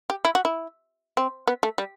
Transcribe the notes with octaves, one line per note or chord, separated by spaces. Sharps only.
G4
E4
F#4
E4
C4
B3
A3
G3